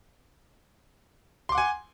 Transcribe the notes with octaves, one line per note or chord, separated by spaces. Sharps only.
F#5 G#5 C6 D6